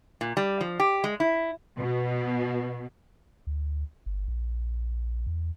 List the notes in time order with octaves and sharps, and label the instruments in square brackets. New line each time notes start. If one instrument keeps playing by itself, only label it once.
[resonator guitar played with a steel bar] A#2
G3
F3
G4
G#3
E4
[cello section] B2
[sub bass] D2
G1
A#1
E2